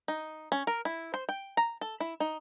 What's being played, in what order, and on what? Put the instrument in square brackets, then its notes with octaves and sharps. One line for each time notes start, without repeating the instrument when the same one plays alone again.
[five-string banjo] D#4
C#4
A#4
E4
C5
G5
A#5
A4
E4
D#4